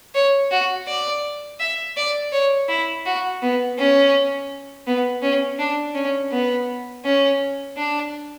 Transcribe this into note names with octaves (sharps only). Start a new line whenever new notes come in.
C#5
F#4
D5
E5
D5
C#5
E4
F#4
B3
C#4
B3
C#4
D4
C#4
B3
C#4
D4